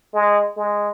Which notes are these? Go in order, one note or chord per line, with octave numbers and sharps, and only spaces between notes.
G#3
G#3